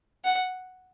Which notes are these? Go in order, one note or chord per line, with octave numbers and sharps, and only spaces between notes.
F#5